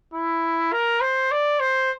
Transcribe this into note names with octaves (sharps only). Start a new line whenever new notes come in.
E4
A#4
C5
D5
C5